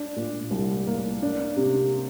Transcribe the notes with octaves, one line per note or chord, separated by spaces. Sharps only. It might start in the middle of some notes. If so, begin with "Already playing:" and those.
Already playing: D4
A#2
C2
A#3
D4
C3